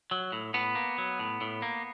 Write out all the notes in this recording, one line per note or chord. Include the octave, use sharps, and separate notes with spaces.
F#3
A2
A2 B3
A#3
F#3
A2
A2
A#3